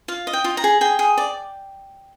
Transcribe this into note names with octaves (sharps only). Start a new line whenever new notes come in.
F4 F5
D#5
G5
F4
A#5
G#4
G#4 G5
G#4
D5